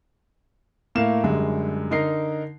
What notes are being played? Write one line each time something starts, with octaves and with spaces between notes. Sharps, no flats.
A2 A3 A#3 F5 E7
F#2 D3 G3 G#3
D3 D#4 A#4 C7